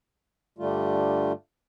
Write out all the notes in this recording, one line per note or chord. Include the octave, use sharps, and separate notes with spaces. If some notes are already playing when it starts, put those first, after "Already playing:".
G2 D3 G3 A3 F4